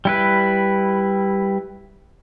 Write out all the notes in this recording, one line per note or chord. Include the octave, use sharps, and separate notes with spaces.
G3 E4 B4